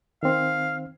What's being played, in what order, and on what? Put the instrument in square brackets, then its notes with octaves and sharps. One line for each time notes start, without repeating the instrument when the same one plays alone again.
[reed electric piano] D#3 C4 [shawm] F5